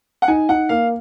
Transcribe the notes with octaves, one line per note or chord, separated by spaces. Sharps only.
F#5
D#4 G#5
D#4 F#5
A#3 F5